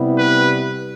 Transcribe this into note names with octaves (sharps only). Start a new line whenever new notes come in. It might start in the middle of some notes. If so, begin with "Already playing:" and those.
Already playing: C3 G3 B3 E4
B4